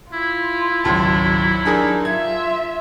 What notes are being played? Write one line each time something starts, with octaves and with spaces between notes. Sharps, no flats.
E4 F4
G#1 C#2 F#3 A5
D4 D#4 G#4 A#4
F4 E5 G#6